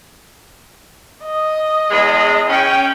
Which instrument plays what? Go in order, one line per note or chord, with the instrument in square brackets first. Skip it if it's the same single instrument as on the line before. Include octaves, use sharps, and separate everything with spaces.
[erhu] D#5
[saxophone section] E2 G#3
[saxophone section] C#4 [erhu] G5